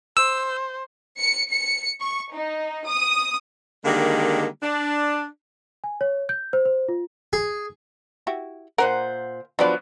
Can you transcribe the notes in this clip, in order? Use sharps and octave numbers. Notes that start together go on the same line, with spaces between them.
C5 E6
C#7
C#7
C#6
D#4
D#6
D3 D#3 G3 G#3 A#3
D4
G#5
C#5
G6
C5
C5
F4
G#4
E4 F#4 G4
A#2 A#4 C5 F#5
F3 F#3 B3 D4 D5